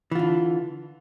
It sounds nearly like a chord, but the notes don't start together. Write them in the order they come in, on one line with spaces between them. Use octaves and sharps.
E3 F4 D3